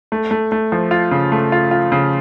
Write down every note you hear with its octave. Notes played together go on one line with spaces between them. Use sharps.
A3
A3
A3
F3
F4
C#3
A3
F4
F4
C#3